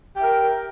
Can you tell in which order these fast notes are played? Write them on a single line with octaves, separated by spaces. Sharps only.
G4 E5 A#4